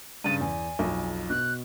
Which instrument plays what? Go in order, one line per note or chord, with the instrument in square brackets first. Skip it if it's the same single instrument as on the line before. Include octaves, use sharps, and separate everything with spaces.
[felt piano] G2 C#3 A6 [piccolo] D#7
[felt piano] E2 [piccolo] G#5
[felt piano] B1 F2
[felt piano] B2 [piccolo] F#6